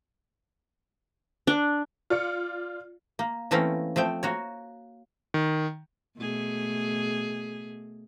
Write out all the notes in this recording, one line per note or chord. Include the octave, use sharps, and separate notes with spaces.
D4
F4 D5 C#7
A#3
E3 A3 A#3 C4 C#4 A#4
F3 A3 C4 G5
A#3 F#4 C#5
D#3
B2 A3 G#4